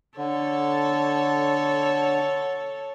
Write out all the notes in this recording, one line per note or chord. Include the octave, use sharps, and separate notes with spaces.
D3 A4 C#5